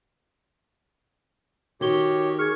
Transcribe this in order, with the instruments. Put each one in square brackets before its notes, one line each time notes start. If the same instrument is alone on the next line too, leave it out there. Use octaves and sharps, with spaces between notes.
[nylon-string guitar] D#3 [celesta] F#4 G7 [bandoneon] G4 C#5
[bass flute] G#4 [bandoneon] C#6 [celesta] F6 G#6